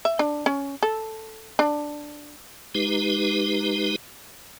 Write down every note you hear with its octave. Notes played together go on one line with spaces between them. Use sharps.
E5
D4
C#4
A4
D4
G#3 D#4 G4 B4